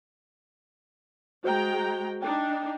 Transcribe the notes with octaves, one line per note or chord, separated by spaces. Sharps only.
G#3 F#4 C5 G5 A#5
D4 D#4 G5